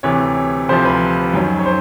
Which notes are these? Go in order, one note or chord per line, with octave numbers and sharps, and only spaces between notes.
D2 C3 E3 C#5
D2 C3 F3 C5
B4
F#2 D#3 F#3
C#5
C5